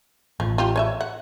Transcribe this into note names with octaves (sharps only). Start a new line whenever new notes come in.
A1 F3
F4 G4
C#5 D#5 E5
F#5